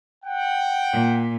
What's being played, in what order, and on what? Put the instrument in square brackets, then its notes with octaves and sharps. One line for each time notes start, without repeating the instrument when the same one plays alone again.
[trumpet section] F#5 G5
[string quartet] A#2